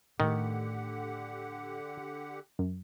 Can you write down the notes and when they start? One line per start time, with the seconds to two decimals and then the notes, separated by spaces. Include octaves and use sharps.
0.20 A2 D3 D#3 A3 G4 F#5
2.59 F#2